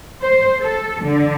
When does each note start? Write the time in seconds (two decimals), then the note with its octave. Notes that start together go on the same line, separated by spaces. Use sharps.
0.22 C5
0.61 A4
1.04 D3